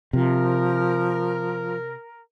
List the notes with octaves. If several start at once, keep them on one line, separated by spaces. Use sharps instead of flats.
C3 F3 A#4